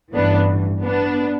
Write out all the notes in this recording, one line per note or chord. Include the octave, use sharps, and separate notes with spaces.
A1 G2 E3 B3 D4
B3 D4